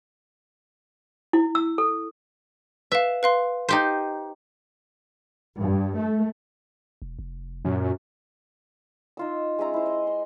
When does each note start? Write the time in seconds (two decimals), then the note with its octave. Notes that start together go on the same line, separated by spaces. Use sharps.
1.33 E4
1.55 E6
1.78 A4
2.92 B4 E5 F5
3.23 B4 F5 C6
3.69 D#4 G4 C5
5.57 G2
5.98 A3
7.02 E1
7.19 F1
7.65 F#2 A#2
9.17 D#4 F4 E6
9.59 G#3 C#4 E5 A#5
9.74 E4 C5
9.86 D#5
10.07 C6